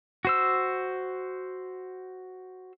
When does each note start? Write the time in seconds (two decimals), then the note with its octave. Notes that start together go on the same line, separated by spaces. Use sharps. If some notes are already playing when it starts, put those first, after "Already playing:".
0.25 F#4 C5 E6